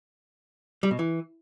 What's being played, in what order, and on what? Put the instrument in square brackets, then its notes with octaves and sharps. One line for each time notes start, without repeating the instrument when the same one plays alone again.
[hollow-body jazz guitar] G3
B2
E3